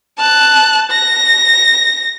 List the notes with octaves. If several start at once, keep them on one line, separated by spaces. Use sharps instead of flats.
A5 F#6
A#6